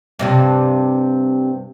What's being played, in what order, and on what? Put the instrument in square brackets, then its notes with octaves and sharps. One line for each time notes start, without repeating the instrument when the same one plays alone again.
[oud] G2 C3 G3